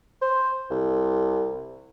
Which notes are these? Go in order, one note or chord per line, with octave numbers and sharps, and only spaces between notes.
C5
C2